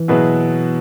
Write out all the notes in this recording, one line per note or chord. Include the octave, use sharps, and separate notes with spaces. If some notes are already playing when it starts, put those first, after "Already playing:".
Already playing: E3
B2 F#3 E4 G#4 B4